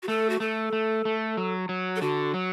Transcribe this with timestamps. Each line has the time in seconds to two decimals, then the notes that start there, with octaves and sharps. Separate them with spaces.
0.03 F#4
0.08 A3 A4
0.30 F#4
0.40 A3 A4
0.73 A3
1.05 A3
1.37 F#3
1.69 F#3
1.96 A4
2.01 D3 F#4
2.34 F#3